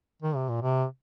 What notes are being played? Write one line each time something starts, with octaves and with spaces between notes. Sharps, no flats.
D#3
C3
A#2
C3